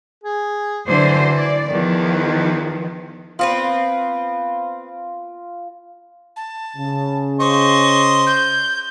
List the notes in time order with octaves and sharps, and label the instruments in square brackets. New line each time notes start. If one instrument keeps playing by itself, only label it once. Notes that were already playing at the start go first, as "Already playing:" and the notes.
[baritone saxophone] G#4
[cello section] D3 F#3 C5 [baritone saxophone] E3
[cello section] D5
[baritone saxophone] E2 [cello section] D#3 F3
[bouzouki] B3 C4 B4 [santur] F4
[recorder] A5
[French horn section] C#3
[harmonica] C5 D#5 C6 [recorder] C#6
[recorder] G6